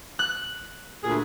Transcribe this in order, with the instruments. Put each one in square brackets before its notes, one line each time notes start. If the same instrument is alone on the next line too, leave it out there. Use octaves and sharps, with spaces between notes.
[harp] F#6
[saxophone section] D2 A#2 G#4